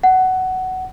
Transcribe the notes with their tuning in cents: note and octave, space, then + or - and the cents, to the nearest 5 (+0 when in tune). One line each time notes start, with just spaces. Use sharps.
F#5 +15